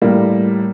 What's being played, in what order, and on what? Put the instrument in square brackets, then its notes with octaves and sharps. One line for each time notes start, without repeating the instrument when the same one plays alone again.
[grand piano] A2 G3 A#3